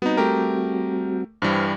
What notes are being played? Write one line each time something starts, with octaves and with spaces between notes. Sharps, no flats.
G3 B3 C4 D#4 F#4
A3 G4 A#4
G2 E3 G3 C5 G5 F6